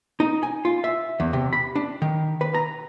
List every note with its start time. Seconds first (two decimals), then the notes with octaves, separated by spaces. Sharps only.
0.20 D#4
0.43 G#5
0.65 F4
0.84 E5
1.20 E2
1.33 C3
1.53 B5
1.76 D4
2.02 D#3
2.41 B4
2.54 A#5